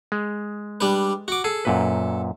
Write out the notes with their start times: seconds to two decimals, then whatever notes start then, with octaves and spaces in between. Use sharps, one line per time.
0.12 G#3
0.81 G3 D4 B4
1.28 F#4 D6
1.44 G#4 A4
1.65 F#2 A#2 B4